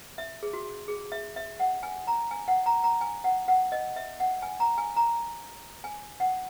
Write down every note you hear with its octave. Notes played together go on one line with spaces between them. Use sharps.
E5
G#4
F#4
G#4
E5
E5
F#5
G#5
A#5
G#5
F#5
A#5
A#5
G#5
F#5
F#5
D#5
E5
F#5
G#5
A#5
G#5
A#5
G#5
F#5